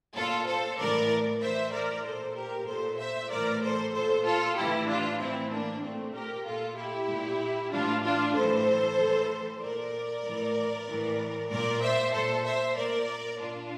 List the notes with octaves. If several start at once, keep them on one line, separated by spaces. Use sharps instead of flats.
A#2 F4 A4
A4 C5
A2 E3 A#4 D5
A2 E3 C5 E5
A#4 D5
A#2 A4 C5
G4 A#4
A#2 A4 C5
C5 E5
A2 E3 A#4 D5
A4 C5
A#2 A4 C5
F4 A4
A2 E3 E4 G4
D4 F4
A2 E3 C4 E4
A#3 D4
A#2 A3 C4
G4 A#4
A#2 F4 A4
E4 G4
A#2
A2 E3 D4 F4
D4 F4
A2 E3 A4 C5
A2 E3
A#2 A#4 D5
A2 E3
A2 E3
A#2 A#4 D5
C5 E5
A#2 A4 C5
C5 E5
A#2 A#4 D5
A#2 D4 F4